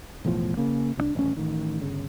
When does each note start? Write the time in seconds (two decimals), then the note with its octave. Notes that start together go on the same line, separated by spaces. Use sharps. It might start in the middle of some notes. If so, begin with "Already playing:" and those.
0.25 B1 E2 A2 F3
0.57 C#3 A#3
0.97 C2 F3 D4
1.15 D#1 A1 C#4
1.37 A1 D#3
1.80 G1 C#3